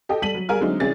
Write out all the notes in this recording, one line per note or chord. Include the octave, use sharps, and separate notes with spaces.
G4 A4 D#5 G5
G3 A4 B6 D#7 F#7
F#3
G3 G#4 A#4 F5 G#5 F6
D3 F#3 G#3 A3 C4 D#4
C2 E3 C#4 G#4 A6